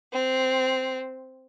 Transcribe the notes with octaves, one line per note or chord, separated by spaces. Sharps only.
C4